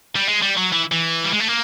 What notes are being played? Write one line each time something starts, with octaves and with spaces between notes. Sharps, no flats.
G3
G#3
G3
F#3
E3
E3
G3
G#3
A3
A#3